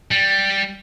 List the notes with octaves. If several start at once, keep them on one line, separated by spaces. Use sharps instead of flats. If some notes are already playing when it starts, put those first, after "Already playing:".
G3